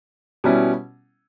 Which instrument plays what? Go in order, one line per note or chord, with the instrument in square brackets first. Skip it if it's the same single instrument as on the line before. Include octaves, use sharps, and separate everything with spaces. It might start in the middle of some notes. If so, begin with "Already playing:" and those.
[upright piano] B2 G3 C#4 E4